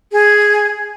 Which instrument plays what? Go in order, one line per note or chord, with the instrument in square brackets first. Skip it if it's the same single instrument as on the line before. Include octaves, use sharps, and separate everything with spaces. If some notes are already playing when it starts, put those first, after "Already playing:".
[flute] G#4